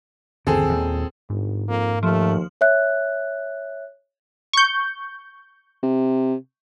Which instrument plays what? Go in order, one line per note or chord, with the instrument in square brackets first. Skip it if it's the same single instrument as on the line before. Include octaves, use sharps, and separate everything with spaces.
[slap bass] G1 D#2 C#3 [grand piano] C4 G#4 A4
[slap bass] D#1 D#2
[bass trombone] G1 [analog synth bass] G#2
[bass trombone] F2 [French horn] A#3
[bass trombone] D#2 [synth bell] F3 [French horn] A3
[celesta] C#5 E5 F#6
[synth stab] C#6 G6
[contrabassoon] C3